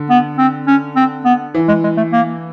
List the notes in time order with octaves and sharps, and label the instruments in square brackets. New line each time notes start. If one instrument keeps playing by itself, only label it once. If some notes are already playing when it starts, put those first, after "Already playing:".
Already playing: [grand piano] D3
[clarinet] B3
C4
C#4
C4
B3
[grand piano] E3
[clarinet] G#3
G#3
A3
A#3